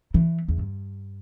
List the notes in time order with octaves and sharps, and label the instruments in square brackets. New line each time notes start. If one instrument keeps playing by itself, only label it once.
[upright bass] E3
E2
G2